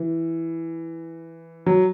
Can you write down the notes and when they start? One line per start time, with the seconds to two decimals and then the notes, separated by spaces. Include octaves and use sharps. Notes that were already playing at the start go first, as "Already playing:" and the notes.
Already playing: E3
1.66 F#3